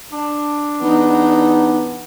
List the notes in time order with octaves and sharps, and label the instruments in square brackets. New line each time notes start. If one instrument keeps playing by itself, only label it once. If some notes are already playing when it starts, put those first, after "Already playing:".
[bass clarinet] D4
[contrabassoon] E2 [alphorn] B3 [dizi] D#4